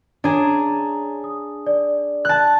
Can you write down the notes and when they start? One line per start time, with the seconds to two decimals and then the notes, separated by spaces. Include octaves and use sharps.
0.24 D4 G#4 C#5 A#5
1.24 D#6
1.67 D5
2.25 A5 F#6